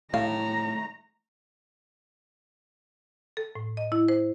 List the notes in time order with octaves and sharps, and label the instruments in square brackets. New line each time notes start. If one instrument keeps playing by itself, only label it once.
[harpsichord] A2 [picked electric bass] A3 [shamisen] F5 [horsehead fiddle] A#5
[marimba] A4
A2
D#5
E4
C5